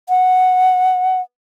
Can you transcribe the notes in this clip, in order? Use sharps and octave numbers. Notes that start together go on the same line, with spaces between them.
F#5